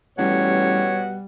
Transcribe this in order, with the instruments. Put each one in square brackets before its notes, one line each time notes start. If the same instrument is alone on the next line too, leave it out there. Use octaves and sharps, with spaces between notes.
[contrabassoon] A1 [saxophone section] B2 F#5 [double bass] G3 [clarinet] C#5